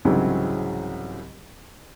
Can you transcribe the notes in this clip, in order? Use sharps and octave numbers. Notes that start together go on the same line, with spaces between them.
C2 G#2 C#3 E3 F#3 C4